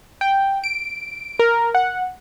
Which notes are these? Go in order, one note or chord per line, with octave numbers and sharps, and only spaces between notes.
G5
D7
A#4
F#5